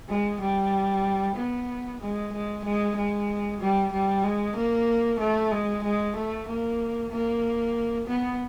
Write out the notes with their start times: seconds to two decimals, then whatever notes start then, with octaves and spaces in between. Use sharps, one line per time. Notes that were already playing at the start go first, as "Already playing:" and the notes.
0.09 G#3
0.41 G3
1.37 B3
2.01 G#3
2.33 G#3
2.65 G#3
2.96 G#3
3.61 G3
3.93 G3
4.24 G#3
4.56 A#3
5.20 A3
5.52 G#3
5.84 G#3
6.16 A3
6.48 A#3
7.11 A#3
8.07 B3